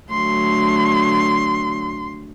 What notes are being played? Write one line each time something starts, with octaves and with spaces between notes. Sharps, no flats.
D3 F#3 A3 C6